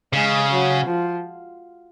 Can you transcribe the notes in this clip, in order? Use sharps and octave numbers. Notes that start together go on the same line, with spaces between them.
C#3 G#3
F#3
F3